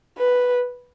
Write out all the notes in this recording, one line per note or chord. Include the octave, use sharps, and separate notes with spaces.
B4